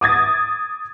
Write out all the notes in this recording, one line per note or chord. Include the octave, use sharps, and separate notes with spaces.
D6 D#6 G#6 A6